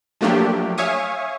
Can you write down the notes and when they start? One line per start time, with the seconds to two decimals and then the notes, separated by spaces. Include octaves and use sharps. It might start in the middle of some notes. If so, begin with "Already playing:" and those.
0.21 F3 F#3 A3 A#3 D4 G4
0.78 C#5 E5 F5 G#5 C#6 D#6